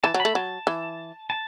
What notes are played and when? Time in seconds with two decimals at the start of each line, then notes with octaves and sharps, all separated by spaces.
0.04 E3 A5
0.14 F#3
0.20 B5
0.25 A3
0.35 F#3 A5
0.67 E3
1.30 A5